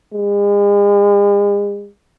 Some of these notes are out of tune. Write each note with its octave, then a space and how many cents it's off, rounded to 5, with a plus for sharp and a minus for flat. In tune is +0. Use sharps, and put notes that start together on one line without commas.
G#3 -40